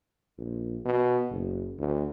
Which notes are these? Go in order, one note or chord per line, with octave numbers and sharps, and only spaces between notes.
A#1
B2
F#1
D2